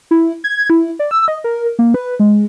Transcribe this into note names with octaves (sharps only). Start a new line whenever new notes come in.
E4
G#6
E4
D5
E6
D#5
A#4
A#3
B4
G#3